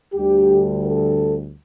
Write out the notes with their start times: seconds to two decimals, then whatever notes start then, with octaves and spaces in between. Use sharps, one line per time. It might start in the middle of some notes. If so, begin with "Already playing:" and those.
0.13 D2 D3 G3 G4
0.83 A4